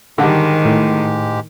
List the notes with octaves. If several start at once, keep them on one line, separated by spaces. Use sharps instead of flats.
G#2 D3 D#3 G3 G#3 G4
A2